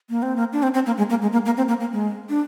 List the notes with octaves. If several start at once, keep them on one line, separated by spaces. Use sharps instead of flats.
A#3
C4
A#3
D4
C4
C4
A#3
G#3
A#3
G#3
A#3
A#3
C4
A#3
A#3
G#3
D4